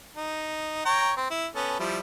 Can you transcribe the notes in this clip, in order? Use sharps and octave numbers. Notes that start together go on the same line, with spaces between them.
D#4
C#5 G5 A#5
C4
E4
B3 C#4 A4
F3 G3 E4